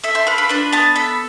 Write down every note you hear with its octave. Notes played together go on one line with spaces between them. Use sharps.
A4 E5
C5
F4 B4
B4
D4 B4
B3 A5
A4 B5